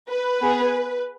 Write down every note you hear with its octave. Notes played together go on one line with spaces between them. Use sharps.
B4
B3 G#4